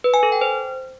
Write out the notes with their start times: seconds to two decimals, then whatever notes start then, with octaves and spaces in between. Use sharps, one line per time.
0.04 B4
0.14 G#5
0.23 A4
0.32 G5
0.41 C5